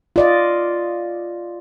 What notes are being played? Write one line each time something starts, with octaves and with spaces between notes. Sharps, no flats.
F4 D5 D#5